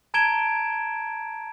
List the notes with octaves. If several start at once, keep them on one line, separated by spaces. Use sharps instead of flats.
A5 A#5 G#6 D7 E7 G7